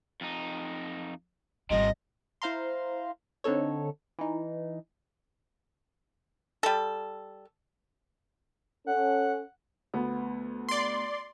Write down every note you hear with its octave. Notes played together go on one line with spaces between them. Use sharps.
F2 D#4
G#1 C3 F3 G3 D#5
E4 C5 F5 A#5 C6
D3 C4 D#4 A4 C#5
E3 D#4
G3 A4
C#4 A4 F#5
D2 B3
D5 C6